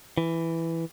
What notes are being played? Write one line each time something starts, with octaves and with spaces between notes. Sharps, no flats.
E3